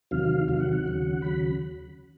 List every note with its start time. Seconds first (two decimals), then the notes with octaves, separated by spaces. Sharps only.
0.11 E2 C3 D#3 F#3 F5
0.48 E2 C3 D#3 F#3 F5
0.60 F#5
0.73 F#5
0.85 D#2 C#3 F#3
1.22 D#2 C#3 F#3 B5